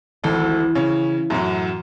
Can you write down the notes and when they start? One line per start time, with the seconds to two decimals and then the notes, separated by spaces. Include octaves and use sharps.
0.24 G#1 D2 E3 A4
0.75 C#3 C#4
1.30 F#2 A2 F#3